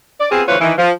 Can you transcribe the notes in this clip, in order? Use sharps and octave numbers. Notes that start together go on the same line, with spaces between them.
D5
B3 C4 F4 G4 G#4
D2 E3 F3 F4 B4 C#5
D#3 E3
F3